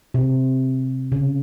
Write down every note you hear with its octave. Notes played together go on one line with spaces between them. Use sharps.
C3
C#3